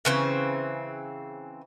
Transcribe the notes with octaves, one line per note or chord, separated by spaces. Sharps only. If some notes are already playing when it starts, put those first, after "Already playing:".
C#3 E3 C4